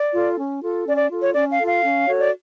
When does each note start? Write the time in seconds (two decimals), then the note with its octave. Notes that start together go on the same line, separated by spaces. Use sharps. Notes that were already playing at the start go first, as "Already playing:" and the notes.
Already playing: D5
0.14 F4 A4
0.38 C#4
0.63 F4 A4
0.87 C#4 D5
0.98 D5
1.10 F4 A4
1.22 C#5
1.34 C#4 D5
1.51 F5
1.59 F4 A4
1.67 F5
1.83 C#4
2.07 F#4 A4 C#5
2.20 D5